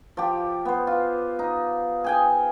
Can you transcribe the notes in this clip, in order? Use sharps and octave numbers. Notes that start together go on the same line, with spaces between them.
F3 G4
B3 C5
F4
D#4
G#4 G5 G#5